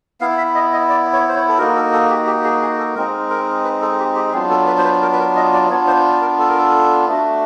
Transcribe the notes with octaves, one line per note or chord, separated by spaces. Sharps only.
B3 E4 F5
E5
D#5
D#5
D5
C#5
C5
C#5
A4
A#3 D#4 F#4 A#4
A4
A4
G4
G4
G#4
G#4
A4
G#3 C4 D#4 A#4
A#4
B4
A4
G4
G4
F#3 B3 D4 F4 G#4
A4
B4
C5
B4
A#4
B4
A#4
D#5
D5
B3 D4 F4 C#5
C5
A#4
A4
A#4
A4
A3 D4 F#4